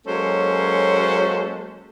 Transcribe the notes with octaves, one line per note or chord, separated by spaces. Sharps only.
F#3 G#3 A#3 C#4 A4 C5